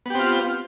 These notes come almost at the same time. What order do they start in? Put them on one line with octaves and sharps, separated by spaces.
B3 G4 C4 F4